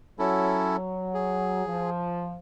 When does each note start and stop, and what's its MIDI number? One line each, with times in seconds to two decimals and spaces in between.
0.19 1.66 54
0.19 0.77 61
0.19 0.77 64
0.19 0.77 69
1.14 1.90 68
1.66 2.35 53